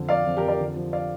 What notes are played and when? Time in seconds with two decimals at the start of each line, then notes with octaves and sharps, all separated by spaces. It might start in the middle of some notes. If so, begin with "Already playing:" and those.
Already playing: F2 D3
0.09 F3 D5 F5
0.25 F2
0.37 G4 A#4
0.42 F2
0.48 A#4 D5
0.60 D3
0.76 F3
0.93 D5 F5